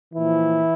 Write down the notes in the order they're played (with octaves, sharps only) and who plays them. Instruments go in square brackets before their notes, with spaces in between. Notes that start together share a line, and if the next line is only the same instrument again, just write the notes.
[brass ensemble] A#2 E3 F3 E4